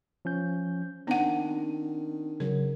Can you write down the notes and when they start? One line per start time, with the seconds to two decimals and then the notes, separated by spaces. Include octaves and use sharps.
0.25 F3 C#4 G6
1.07 D#3 B3 C4 D4 F#5
2.40 C#3 F#3 A#4